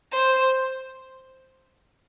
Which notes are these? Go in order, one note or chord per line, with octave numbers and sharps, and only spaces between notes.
C5